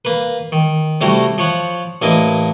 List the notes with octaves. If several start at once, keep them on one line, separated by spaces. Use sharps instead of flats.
A#3 B4
D#3
C3 G3 A3 E4 F#4
F3 C#5 F#5
A1 A#3 D4 E4 D#5